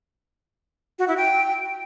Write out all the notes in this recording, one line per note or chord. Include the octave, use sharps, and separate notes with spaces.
F#4
E4
G5